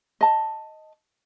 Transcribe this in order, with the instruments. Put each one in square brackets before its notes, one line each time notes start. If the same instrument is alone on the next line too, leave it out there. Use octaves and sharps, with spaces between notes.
[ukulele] D#5 A5